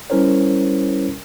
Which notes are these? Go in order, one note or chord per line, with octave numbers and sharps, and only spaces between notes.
G3 C#4 E4 A#4 C5 C#5